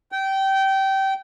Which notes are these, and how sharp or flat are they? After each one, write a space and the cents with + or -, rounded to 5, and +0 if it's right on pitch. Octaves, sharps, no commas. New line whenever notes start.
G5 -20